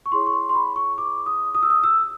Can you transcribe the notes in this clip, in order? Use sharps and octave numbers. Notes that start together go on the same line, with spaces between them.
C#6
E4 G#4 C#5 C6
C#6
C6
C6
B5
C#6
D6
D#6
D#6
E6
D#6
E6